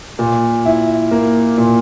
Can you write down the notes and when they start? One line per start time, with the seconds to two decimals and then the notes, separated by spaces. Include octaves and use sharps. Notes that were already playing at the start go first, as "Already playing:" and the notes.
0.19 A#2
0.65 E4
1.11 A#3
1.58 A#2